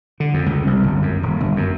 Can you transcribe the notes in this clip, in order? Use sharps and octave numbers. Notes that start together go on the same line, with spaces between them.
D3
F2
C#2
C2
G1
F#2
D#1
G1
F#2